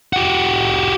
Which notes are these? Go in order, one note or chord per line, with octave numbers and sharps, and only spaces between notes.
F#4 G4